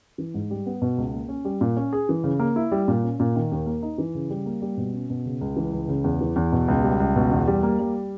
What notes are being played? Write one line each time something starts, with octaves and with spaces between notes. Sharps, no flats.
E3
G#2
G3
B3
B2
C#2
A#3
C#4
G3
A#2
C#4
G#4
E3
C#3
A#3
E4
G3
A#2
C#4
A#2
D#3
D#2
A#3
D#4
E3
C#3
G3
A#3
G3
B2
C#4
B2
C#3
C#2
E3
C#2
C#3
E2
E3
E2
B2
C#2
G3
C#2
B2
E2
G3
A#3
G3